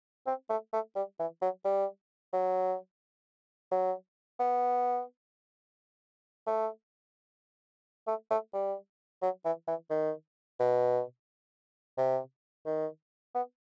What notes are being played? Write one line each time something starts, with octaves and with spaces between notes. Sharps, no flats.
C4
A3
A3
G3
E3
F#3
G3
F#3
F#3
B3
A3
A3
A3
G3
F#3
E3
E3
D#3
B2
C3
D#3
B3